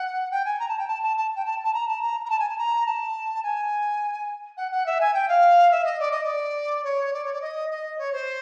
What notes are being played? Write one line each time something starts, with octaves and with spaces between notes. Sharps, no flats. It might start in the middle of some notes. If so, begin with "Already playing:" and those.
Already playing: F#5
G5
G#5
A#5
A5
G5
A5
A5
A5
G5
A5
A5
A#5
A5
A#5
A#5
A5
G#5
A5
A#5
A5
G#5
F#5
F#5
E5
G#5
G5
F5
E5
D#5
D5
D#5
D5
C#5
D5
C#5
D5
D#5
D#5
C#5
C5